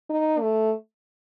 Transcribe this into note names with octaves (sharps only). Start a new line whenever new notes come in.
D#4
A3